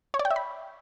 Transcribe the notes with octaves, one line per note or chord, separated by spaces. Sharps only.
C#5
D5
G5
E5
B5